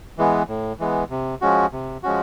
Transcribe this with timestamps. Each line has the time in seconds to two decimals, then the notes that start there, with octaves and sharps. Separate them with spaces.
0.18 E3 G#3 B3
0.48 A2
0.79 E3 G#3 B3
1.10 C3
1.41 F3 G#3 C#4 F#4
1.73 C3
2.03 F3 G#3 C#4 F#4